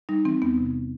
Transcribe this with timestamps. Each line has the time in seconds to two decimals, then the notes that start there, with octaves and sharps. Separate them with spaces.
0.09 G3 D#4
0.25 E3 C4
0.42 E2 B3
0.58 C3